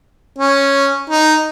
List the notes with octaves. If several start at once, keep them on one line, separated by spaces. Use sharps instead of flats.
C#4
D#4